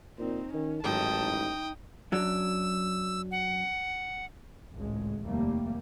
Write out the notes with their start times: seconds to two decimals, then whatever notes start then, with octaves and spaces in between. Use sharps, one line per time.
0.18 A#2 C4 D#4
0.54 D#3 C#4
0.84 A1 G#2 D#3 F#3 G5 A5 D#6
1.21 D#4
2.12 F#2 F#3 D4 E6
3.31 F#5
4.75 G#1 C#2 A2 G#3
5.25 F1 D#2 G3 A3 A#3